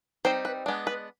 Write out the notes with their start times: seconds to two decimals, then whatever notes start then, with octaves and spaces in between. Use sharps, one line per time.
0.25 G3 C4 D#4 C5
0.45 B4
0.66 G#3 B3 D4
0.87 B4